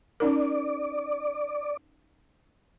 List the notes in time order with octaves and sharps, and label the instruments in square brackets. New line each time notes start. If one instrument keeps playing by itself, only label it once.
[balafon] C#4 D#4 A#4 [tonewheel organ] D5